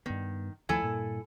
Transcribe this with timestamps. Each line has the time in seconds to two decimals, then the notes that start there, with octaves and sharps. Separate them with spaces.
0.06 G2 D#3 B3
0.69 D#2 F3 A3 E4 A4 G#5
0.82 G2 A#2